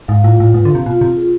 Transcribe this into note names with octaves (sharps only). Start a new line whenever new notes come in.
G#2 F5
A2 F4
A2 F4
G#2 B4
D3
C3 F5
B2 F4
C3 F4
G#4